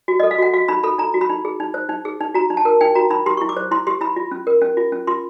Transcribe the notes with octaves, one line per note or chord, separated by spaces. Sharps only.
F#4
D#5
A4
F5
F#4 F#5
F#4 F5
D#4 B5
A4 B5
D#4 A#5
F#4
B5
D#4
G#4
D#4
C5
D#4
G#4
D#4
F#4 A#5
D#4
A5
A#4
D#4 G5
F#4 A#5
D#4 B5
G4 C6
C#6
E4
D6
C5
E4 C6
G4 C6
E4 B5
F4
C#4
A#4
C#4
F4
C#4
F4 C6